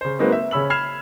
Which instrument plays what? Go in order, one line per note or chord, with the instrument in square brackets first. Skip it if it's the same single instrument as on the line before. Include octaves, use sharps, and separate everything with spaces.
[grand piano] C#3 C5
F#3 G#3 A#3 C4 D#4 B4
E5
C#3 C#5 B5 E6 F#7
B5 F6 G#6 C7 E7 F7